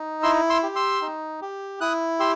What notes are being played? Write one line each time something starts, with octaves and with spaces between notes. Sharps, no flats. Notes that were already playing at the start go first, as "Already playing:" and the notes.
Already playing: D#4
E4 C6 E6
C6 E6
G4
C6 E6
D#4
G4
E4 D#6 F#6
G4 C6 E6